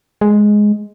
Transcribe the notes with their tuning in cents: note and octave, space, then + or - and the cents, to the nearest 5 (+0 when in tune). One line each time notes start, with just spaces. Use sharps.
G#3 +5